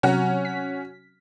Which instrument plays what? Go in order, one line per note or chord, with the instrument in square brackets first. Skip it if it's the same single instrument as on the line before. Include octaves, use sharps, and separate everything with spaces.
[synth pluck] C3 F#3 A#5 [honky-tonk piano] C#4 F#4
[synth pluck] B6